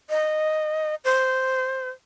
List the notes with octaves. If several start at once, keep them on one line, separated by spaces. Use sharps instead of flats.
D#5
C5